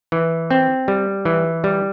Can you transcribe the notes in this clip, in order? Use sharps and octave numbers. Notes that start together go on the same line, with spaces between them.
E3
C4
G3
E3
G3